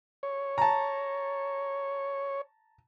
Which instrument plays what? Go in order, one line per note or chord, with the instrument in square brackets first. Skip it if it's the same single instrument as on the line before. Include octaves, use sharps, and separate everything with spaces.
[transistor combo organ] C#5
[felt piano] A5 A#5